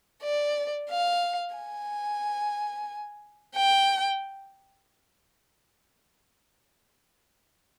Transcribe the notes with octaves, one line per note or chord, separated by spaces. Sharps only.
D5
F5
G#5
G5